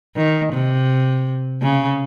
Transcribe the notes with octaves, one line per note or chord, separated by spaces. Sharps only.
D#3
C3
C#3